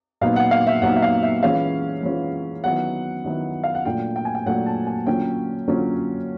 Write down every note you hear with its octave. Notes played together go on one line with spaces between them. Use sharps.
A#2 F#3 B3 D#4 F5
F#5
F5
E5
A#2 F#3 B3 D#4 F#5
E5
F5
E5
E3 G#3 C#4 F4 F5
E3 G#3 C#4 F4
D#3 F#3 B3 E4 F#5
D#3 F#3 B3 E4
F5
F#5
A#2 F#3 A3 D4 F4 G5
G5
G#5
G5
A#2 F#3 A3 D4 F4 F#5
A5
G#5
D3 F#3 A#3 C#4 F4 G5
D3 F#3 A#3 C#4 F4